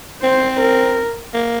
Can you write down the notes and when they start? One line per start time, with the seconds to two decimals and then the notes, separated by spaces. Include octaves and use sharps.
0.23 C4 C5
0.60 A#4
1.34 A#3